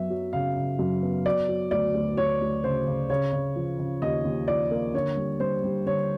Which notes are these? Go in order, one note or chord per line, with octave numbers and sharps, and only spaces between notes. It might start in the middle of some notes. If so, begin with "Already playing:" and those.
Already playing: F#2 F#3 B3 E5
F#3
C#3 F5
C#3
F#2
B3
F#3 D5
F#3
D2 D5
D2
D2 C#5
D2
C#3 C5
C#3
C#3 C#5
C#3
F3
C#3
D#2 D#5
D#2
F3 D5
A#3
D3 C#5
G3
G3 C5
G3
D3 C#5